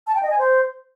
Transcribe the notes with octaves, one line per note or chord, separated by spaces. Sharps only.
A5
G5
D#5
G#5
C5